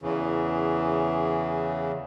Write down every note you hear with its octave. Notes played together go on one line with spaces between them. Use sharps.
E2 C#3 E3